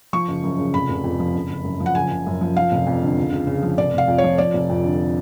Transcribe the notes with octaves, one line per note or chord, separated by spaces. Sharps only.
F3 C#6
F#1
F#2
C#3
F1 B5
F1
F2
F3
F#1
F#1
F#2
F3
F#5
F#1 G#5
F#1
F#2
F3
F3 F5
F1
F2
D3
C#2
C#2
C#3
F3
F1 D5
F1 F5
F2
C#5
F3
F3 D5
F1
F2
D3